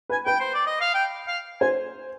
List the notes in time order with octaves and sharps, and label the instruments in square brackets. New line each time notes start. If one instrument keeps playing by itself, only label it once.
[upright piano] B4 [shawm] G#5
[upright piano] B4 [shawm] G5
[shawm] C5
D5
D#5
F5
G5
F5
[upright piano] C5 [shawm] G#5